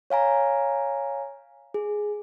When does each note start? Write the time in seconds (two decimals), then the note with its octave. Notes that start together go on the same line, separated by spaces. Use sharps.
0.10 C#5 F5 G#5 A#5
1.74 G#4